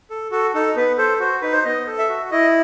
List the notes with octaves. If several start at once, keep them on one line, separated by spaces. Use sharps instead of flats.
A4
F#4 A4
D#4 A4
B3 B4
A4 C5
F#4 C5
D#4 B4
C5
B3 D#5
A4
E5
F#4
E4 D#5